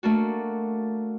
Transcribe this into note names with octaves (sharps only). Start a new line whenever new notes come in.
A3 A#3 D4 F#4